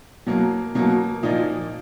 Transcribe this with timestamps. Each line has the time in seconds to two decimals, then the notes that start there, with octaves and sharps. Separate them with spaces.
0.27 B2 F#3 A#3
0.75 B2 F#3 A#3
1.23 A#2 F3 A#3 D#4